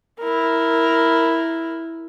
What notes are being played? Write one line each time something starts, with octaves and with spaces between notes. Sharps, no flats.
E4 A#4